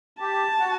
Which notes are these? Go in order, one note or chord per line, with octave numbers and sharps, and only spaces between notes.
G4 A5
F#4